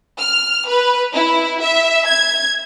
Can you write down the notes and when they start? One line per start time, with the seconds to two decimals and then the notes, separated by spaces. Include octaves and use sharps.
0.19 F6
0.67 B4
1.14 E4
1.60 E5
2.05 G#6